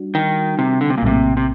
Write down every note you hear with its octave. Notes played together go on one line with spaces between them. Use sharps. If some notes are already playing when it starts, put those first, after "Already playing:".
Already playing: G3 D4 F#4
D#3
C3
D3
C3
A#2
A#1 A2 C3 F#3 A#3
C3